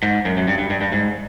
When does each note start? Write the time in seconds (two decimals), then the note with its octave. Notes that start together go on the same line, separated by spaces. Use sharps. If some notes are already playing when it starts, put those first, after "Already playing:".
0.03 G#2
0.25 F#2
0.37 F#2
0.48 G2
0.58 G2
0.70 G2
0.81 G2
0.92 G#2